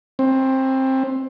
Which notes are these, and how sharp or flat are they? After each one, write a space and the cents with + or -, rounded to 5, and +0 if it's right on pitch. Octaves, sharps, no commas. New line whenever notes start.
C4 +20